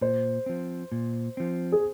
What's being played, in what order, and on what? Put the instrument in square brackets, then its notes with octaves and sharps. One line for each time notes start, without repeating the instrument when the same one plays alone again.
[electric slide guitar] A#2 [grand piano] C5
[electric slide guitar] F3 C4
A#2
F3 C4
[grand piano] G#4